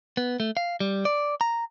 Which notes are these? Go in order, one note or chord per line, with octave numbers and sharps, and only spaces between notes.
B3
A3
F5
G3
D5
A#5